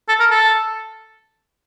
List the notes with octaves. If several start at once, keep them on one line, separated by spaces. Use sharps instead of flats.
A4
A#4
A4